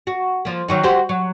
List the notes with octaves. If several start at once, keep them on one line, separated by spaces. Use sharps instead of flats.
F#4
F3 A#3
D#3 F#3 D#4
F#4 G4 C5
F#3